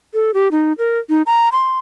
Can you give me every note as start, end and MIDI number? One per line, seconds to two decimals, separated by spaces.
0.14 0.31 69
0.34 0.48 67
0.51 0.73 63
0.78 0.99 70
1.10 1.22 63
1.26 1.49 82
1.52 1.79 84